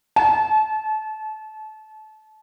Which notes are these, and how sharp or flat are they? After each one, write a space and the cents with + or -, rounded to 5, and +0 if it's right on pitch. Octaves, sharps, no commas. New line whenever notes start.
A5 -30